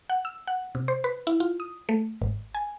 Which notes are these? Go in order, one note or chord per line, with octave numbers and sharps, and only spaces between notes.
F#5
E6
F#5
C3
C5
B4
E4
F4
D#6
A3
G#1
G#5